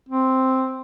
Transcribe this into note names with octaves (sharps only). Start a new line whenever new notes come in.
C4